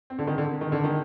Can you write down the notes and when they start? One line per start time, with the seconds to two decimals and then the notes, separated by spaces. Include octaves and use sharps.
0.10 C4
0.19 D3
0.27 D#3
0.38 D3
0.61 D#3
0.72 D3
0.84 D#3